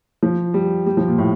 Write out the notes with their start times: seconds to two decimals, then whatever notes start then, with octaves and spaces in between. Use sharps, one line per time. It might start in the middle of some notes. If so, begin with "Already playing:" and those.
0.23 F3
0.54 G3
0.86 G3
0.97 F3
1.08 A#2
1.18 A2